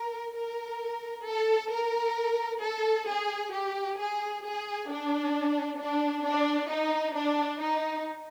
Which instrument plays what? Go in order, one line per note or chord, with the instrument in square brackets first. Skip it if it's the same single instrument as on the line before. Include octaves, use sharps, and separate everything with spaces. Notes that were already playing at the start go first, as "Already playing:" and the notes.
Already playing: [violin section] A#4
A#4
A4
A#4
A4
G#4
G4
G#4
G#4
D4
D4
D4
D#4
D4
D#4